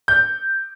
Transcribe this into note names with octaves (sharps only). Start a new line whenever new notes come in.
G6